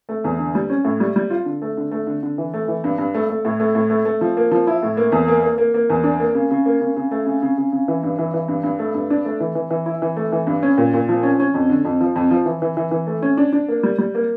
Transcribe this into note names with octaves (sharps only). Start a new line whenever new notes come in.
A3
E2
D3
G3
C#4
A2
G3
G3
F4
D3
A3
D3
A3
D3
D3
E3
A3
E3
G2
G2
A3
A3
A2
A3
A2
A3
A3
F3
A#3
F3
E4
A2
A#3
E2
A#3
A#3
A#3
A#3
E2
D4
A#3
C#3
C#3
A#3
C#3
C#3
A3
C#3
C#3
C#3
C#3
E3
G2
E3
E3
G2
G2
A3
G2
D4
A3
E3
E3
E3
E4
E3
A3
E3
G2
C#4
A#2
A#2
F3
C#4
C#4
F2
D3
F2
F3
F2
F3
E3
E3
E3
E3
A3
C#4
D4
D4
A#3
G3
G3
A#3